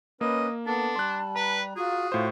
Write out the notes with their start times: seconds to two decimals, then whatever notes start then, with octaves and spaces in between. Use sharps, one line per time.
0.21 A#3 C#4 B4 D#5
0.66 B3 D4 A4 A5
0.96 G3 C6 F#6
1.36 B4 A#5
1.77 F4 F#4 G#4
2.12 A2 F4 C5